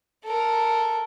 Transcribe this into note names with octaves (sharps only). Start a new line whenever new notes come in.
A4 A#4